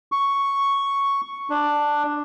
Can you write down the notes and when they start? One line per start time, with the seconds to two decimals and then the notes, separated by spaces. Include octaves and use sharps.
0.12 C#6
1.50 D4